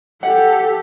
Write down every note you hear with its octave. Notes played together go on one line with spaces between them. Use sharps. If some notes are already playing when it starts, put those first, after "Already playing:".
G4 A4 F#5